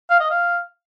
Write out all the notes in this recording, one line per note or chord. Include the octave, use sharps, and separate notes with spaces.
F5
D#5
F5